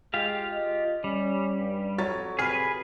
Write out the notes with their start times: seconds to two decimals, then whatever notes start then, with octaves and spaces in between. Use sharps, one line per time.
0.14 G#3 F4 G4 F5
0.52 D#5
1.04 G3 C#4
1.57 G2
1.98 F2 F#3 C#5 A6
2.39 C3 G#4 B4 F6